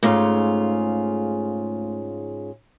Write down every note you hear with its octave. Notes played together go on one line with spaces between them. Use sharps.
G#2 C#3 A3 F4